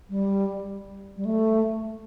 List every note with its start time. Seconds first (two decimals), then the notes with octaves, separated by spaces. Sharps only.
0.10 G3
1.17 G3
1.25 A3